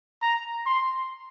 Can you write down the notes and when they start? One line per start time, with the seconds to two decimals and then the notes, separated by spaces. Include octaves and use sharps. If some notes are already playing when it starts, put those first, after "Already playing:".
0.22 A#5
0.66 C6